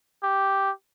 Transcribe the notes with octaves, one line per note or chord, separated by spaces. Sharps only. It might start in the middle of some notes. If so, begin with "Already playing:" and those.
G4